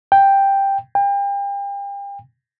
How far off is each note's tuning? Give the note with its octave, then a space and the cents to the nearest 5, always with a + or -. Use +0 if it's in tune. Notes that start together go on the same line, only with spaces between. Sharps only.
G5 +5
G5 +35